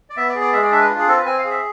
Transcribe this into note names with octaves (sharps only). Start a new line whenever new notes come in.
D5
B3 E5
D5
G#4
D5
G#3 E5
D5
D4 E5
B4
F4
G#4
C4 A4
B4
C4 G#5
F5
G#4
E5